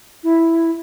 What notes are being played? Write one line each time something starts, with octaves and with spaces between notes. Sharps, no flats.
E4